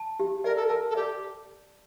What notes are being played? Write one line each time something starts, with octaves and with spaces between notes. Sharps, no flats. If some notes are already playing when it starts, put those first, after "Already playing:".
Already playing: A5
G4
A#4 D5
A4
A#4 A5
A4
G4 D5